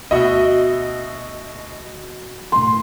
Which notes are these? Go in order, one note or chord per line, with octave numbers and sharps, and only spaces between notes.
D2 B2 B3 F#4 D#5 E5
D2 A2 C6